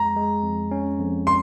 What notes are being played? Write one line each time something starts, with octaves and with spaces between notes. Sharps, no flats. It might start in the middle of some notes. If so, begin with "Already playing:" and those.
Already playing: F2 G#3 A#5
G#3
F2
C#4
F2
C6